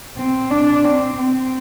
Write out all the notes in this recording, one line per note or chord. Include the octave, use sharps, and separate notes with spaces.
C4
D4
C4
C4